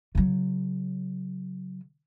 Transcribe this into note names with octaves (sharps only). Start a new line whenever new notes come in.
C#3 F#3